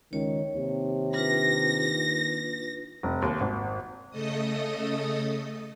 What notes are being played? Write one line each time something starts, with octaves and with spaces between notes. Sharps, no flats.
C#2 D#3 C#5
D#2 C3
D4 F4 B4 A#6
F1
D#2
G#1
C#3 A3 A4 D#5 D#6